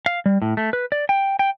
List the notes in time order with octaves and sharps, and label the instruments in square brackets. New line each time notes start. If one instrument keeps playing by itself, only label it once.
[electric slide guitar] F5
G3
A2
A3
B4
D5
G5
G5